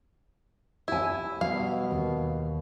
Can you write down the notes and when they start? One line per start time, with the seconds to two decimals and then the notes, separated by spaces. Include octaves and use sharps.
0.88 E4 G4 G#5
1.41 B2 G3 F5
1.91 D#2